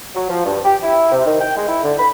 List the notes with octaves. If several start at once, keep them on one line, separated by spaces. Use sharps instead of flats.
F#3
F3
G2
G4
E4
C3
D#3
G5
G#3
E4
D3
B5